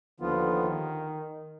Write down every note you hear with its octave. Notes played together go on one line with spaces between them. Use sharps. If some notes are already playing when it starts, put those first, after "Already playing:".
D#2 D3 D#3 F3 B3 F4